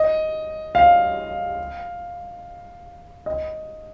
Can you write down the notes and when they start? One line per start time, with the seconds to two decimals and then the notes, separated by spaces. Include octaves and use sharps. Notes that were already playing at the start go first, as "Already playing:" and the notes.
Already playing: D#5
0.75 F5
3.26 D#5